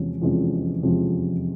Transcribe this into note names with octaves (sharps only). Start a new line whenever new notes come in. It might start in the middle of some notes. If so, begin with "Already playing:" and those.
Already playing: E2 C3 F3 G#3 C#4
E2 C3 F3 G#3 C#4
E2 C3 F3 G#3 C#4